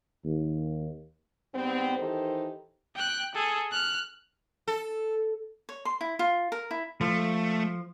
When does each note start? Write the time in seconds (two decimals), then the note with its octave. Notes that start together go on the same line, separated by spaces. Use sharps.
0.24 D#2
1.54 G#2 G3 B3 C4
1.98 D#3 E3 D#4 G4 A4 C5
2.95 G5 F#6
3.35 G#4 A4
3.72 F6 F#6
4.68 A4
5.69 C#5
5.85 C6
6.01 E4
6.19 F4
6.52 A#4
6.71 E4
7.01 F3 A3